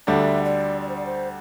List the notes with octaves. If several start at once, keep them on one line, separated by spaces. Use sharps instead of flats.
D2 D3 G3 D4 E5
D5
D5
C5
D5
C5